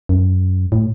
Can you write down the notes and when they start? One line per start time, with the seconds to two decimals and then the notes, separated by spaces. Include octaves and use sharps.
0.09 F#2
0.72 A2